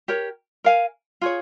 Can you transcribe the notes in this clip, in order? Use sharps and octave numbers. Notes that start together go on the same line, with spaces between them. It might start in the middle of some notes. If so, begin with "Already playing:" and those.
G4 A#4 C#5
A#4 F5 G#5
F4 G#4 C#5